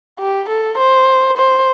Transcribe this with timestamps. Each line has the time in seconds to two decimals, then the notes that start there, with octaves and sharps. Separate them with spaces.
0.19 G4
0.49 A4
0.78 C5
1.37 C5